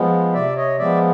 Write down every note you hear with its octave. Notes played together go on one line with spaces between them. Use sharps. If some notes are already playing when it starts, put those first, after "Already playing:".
Already playing: F3 G#3 B3
C3 D5 E5
C#5 D#5
F3 G#3 B3 D5 E5